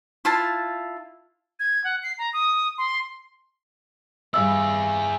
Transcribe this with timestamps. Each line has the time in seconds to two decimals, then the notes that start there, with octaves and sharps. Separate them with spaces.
0.25 E4 F4 A5
1.60 G#6
1.84 F#5
2.03 C7
2.18 A#5
2.33 D#6
2.78 C6
4.34 G2 E4 G#4 E5 E6 A6